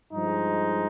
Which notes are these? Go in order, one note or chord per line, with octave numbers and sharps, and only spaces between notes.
G2 F3 G#3 D#4